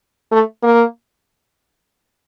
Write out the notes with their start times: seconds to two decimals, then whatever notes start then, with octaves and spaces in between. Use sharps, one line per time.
0.32 A3
0.63 A#3